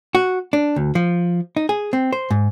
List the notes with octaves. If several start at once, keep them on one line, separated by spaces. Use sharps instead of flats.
F#4
D4
D2
F3
D#4
G#4
C4
C5
G#2